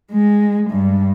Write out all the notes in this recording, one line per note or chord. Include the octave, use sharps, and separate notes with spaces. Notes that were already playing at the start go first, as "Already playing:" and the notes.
G#3
G2